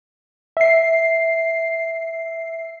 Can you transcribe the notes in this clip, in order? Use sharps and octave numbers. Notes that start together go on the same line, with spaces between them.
E5 C7